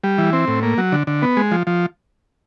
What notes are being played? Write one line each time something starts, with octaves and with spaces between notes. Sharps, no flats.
G3
E3
C4
A2
A#3
F#3
D3
D3
B3
G#3
F3
F3